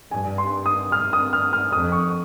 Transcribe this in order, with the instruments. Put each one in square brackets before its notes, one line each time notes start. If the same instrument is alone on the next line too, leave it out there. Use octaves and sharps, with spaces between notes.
[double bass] G2 [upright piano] G#5
[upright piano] C6
D#6
[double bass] G2 [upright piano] F6
[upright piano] D#6
F6
F6
[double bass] F2 [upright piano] D#6
[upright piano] C#6